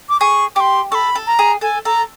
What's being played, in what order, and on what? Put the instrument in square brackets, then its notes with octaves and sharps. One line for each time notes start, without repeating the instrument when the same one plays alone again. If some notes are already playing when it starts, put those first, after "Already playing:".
[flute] D6
[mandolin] G#4 [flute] C#6
[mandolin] G4 [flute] C6 D6
[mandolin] A4 [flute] B5 C#6
[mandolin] A4
[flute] A#5
[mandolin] G#4
[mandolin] A4 [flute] G#5
[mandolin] A4 [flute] A#5